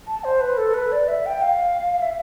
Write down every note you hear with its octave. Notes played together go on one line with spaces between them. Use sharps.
A5
C5
B4
A4
B4
D5
E5
G5
F5
E5